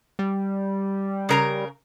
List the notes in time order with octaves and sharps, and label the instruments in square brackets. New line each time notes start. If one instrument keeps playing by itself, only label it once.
[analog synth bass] G3
[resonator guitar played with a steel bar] C#3 A#4 A#5